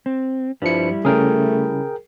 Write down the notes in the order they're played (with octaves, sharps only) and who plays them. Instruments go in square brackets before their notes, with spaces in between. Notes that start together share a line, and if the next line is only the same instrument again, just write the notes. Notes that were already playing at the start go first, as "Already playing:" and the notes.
[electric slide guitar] C4
[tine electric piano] G2 F3 C#7 [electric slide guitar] G3 E4
[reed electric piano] C#3 C#4 [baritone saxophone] A3 [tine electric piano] G#4 A#4 G5